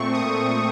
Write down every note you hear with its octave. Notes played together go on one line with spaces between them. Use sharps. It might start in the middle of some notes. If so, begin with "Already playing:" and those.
Already playing: A#2 A3 C4 C#6
D#6